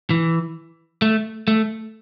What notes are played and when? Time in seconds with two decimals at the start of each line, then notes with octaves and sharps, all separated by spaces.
0.10 E3
1.02 A3
1.48 A3